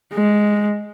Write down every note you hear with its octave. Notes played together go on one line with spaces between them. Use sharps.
G#3